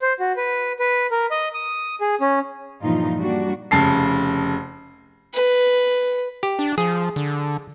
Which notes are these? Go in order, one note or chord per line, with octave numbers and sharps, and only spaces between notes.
C5
F#4
B4
B4
A#4
D#5
D#6
G#4
C#4
G2 A#2 E3 F3 D#4 F4
G3 A#3 D4 F#4
F1 C#3 A5 C7
B4
G4
D4
F3 G#4
D3